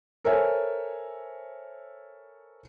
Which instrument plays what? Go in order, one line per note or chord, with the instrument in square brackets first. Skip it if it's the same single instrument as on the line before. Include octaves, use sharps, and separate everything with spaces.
[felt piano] A4 A#4 C5 C#5 E5 G#5